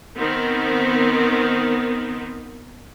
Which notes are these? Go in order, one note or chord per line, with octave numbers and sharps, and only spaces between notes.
D#3 B3 C4